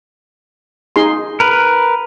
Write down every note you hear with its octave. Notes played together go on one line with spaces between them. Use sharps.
D#4 G#4 C6
A#4 B4